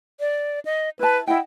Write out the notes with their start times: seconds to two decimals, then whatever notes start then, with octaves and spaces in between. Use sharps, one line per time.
0.20 D5
0.65 D#5
0.99 E4 B4 A5
1.27 E4 D#5 F#5 G5